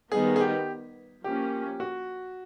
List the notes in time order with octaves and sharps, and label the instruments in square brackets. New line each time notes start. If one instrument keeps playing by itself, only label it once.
[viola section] D#3 G3 B3 D#4 [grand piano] G#4
[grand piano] G#4
G4
[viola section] F3 A#3 C#4 [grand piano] G4
[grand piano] F#4